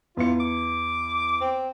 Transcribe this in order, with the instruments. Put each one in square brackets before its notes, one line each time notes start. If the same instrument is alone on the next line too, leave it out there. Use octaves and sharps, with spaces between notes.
[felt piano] E2 C#7 [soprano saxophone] F4
[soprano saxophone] D6
C4